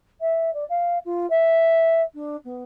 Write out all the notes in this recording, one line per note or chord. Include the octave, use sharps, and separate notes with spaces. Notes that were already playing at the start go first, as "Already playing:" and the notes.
E5
D5
F5
F4
E5
D4
B3